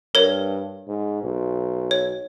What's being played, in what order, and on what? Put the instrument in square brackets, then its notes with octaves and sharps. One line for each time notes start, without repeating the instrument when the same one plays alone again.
[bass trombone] G2 [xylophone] A#4 C#5
[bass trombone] G#2
B1
[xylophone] C#5